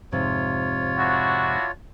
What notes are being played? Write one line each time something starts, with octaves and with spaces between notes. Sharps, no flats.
F2 G#2 C3 F4 C#5
D4 E4 F#4